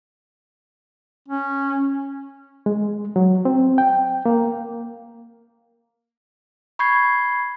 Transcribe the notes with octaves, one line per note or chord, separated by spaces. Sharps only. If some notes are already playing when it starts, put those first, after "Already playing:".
C#4
G#3
F#3
C4
G5
A#3
B5 C#6 G6 G#6 C7